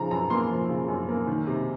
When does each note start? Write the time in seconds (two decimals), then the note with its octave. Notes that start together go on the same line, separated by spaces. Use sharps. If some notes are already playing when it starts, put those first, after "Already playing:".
Already playing: C#3 F3 A#5
0.11 F#2 A#5
0.30 A#3 C6
0.50 F3
0.69 C#3
0.88 F#2
1.09 A#3
1.27 D#3
1.47 C3